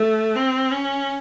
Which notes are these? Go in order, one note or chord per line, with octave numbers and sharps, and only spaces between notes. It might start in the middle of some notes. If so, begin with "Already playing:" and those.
Already playing: A3
C4
C#4